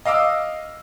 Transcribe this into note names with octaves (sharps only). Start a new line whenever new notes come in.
D#5 F5 D6 E6